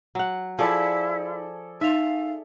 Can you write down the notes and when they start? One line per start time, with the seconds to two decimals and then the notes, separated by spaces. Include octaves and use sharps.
0.15 F#3 F#5
0.59 F3 E4 G#4 A4 D5
1.81 D#4 E5 F5 F7